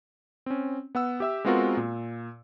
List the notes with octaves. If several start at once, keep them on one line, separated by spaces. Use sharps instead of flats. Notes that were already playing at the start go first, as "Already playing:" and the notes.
C4 C#4
B3 F#5 E6
G4 E5 E6
G#3 B3 C4 F4 F#4 A#4
A#2